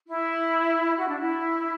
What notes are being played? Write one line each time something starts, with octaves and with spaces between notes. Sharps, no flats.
E4
F#4
D4
E4